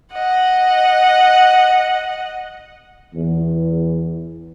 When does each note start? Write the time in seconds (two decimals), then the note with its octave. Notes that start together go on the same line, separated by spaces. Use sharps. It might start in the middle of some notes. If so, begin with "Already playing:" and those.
0.12 D#5 F#5
3.14 E2